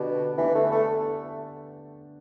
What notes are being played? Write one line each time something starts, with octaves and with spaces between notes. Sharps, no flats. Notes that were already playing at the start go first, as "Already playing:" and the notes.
Already playing: B2 D3 B3 D4 G4
D3 E3 B3 D4 G4
A3
A3